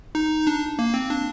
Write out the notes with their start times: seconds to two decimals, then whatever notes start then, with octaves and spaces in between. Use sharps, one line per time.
0.15 D#4
0.47 D4
0.79 A#3
0.94 C4
1.10 D4